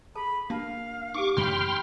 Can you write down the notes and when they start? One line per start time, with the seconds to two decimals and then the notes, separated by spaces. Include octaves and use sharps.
0.15 G#4 A4 A5 B5
0.50 A#3 D4 F#4 F5 A5
1.15 D#4 G4 C#6 D6
1.37 A1 F#2 C#3 G5 B5 C6 F6